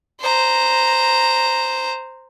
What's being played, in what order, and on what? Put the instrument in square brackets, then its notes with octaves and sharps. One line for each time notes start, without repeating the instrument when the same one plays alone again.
[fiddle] C5 A#5